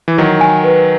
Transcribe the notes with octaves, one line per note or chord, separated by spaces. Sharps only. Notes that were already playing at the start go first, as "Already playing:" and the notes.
E3
D#3 F#3 D#5
G#5
B4